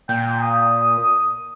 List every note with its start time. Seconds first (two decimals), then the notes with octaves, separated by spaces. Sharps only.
0.09 A#2 G5
0.42 D#6